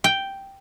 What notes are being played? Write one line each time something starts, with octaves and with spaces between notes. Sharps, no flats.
G5